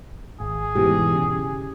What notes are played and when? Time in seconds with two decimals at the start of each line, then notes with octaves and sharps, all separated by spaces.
0.40 G#1 G#4
0.76 G#2 B2 E3 G4
1.15 C#3